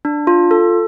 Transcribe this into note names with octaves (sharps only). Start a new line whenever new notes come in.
D4
F4
A4